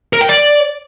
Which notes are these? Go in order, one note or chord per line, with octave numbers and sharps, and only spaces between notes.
A#4
G5
D5